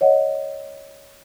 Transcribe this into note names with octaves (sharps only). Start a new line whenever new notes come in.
C#5 D#5 F#5